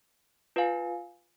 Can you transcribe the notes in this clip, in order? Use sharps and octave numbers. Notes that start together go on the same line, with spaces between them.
F4 B4 F5 G#5